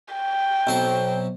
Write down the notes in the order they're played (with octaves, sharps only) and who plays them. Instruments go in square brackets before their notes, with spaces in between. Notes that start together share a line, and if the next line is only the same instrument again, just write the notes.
[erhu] G5
[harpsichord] B1 C4 C#6